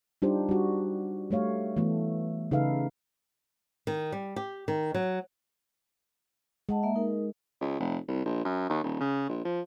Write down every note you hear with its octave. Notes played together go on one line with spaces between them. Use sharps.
G3 D4 D#4 F4 G4 C5
G3 F#4
G3 A3 C#5 F5
E3 A3 B3
C#3 D#4 A4 B4 E5 F5
D#3
G3
G4
D#3
F#3
G#3 D#5 F#5 A5
A#3 E5
D#4 A#4
C#2
F1
C2
A#1
F#2
D#2
D#1
C#3
A#1
F3